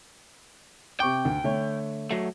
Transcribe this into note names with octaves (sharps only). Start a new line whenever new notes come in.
C3 G5 C#6 D6
D2
D3 A3 C#5
F#3 A3